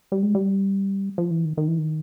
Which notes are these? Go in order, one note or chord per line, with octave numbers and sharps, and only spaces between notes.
G3
G#3
G3
F3
E3
D#3
D#3
E3
D#3